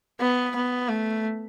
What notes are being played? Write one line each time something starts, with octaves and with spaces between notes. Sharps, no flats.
B3
B3
A3